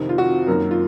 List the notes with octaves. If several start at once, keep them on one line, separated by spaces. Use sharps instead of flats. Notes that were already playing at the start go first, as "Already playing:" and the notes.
Already playing: F2 C3 D#3
F4
F#4
F#2 D#3 A#3 A#4
F4